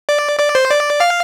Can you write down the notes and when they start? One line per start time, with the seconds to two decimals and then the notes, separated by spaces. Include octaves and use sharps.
0.09 D5
0.39 D5
0.55 C5
0.70 D5
1.00 F5